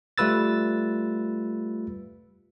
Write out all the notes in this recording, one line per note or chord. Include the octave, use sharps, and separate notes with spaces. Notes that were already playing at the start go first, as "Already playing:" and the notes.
G3 A3 F4 B4 E6 A6